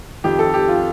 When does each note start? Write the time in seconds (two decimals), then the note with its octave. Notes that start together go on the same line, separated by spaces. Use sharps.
0.24 F2 D#3 G4
0.39 A4
0.54 G4
0.68 F4